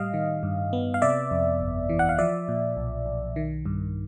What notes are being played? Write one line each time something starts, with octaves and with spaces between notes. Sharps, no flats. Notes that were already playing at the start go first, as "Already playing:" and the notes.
Already playing: A2 G3 D#5 F5
D#3
G2
B3
F5
C3 D5 E5
F2
G1
E3
F#5
F5
F3 D5 E5
A#2
B1
B1
D#3
G2